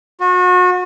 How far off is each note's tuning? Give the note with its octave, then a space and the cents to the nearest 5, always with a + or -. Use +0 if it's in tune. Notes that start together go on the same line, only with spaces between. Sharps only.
F#4 -35